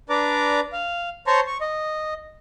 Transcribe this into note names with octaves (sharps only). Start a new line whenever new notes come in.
D4 B4 D5 A#5 D6
F5
C5 C#5 A5 A#5 C6 C#6
C#6
D#5